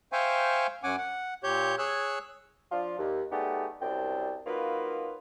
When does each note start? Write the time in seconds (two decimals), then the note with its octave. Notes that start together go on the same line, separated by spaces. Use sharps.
0.12 C5 E5 F5 G5 G#5 C#6
0.83 F#2 C#4 F#5 G#5 D6
0.98 F#5
1.44 A#2 G4 C#5 G6
1.78 G#4 C#5 E6 F#6
2.71 F3 D4 F4
2.98 D#2
3.32 A3 B3 D#4 G4 G#4 D5
3.81 C2 F#2 C4 D4 G5
4.46 F#3 A#3 D#4 F4 B4